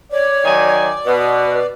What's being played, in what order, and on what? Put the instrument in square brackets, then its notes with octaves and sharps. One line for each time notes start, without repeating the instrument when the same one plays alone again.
[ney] C#5 [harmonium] D5
[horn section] D#3 F#3 G#5
[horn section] B2 [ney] B4